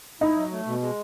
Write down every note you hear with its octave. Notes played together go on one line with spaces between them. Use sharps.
D#4 E4
F#3
A3
B2
G#3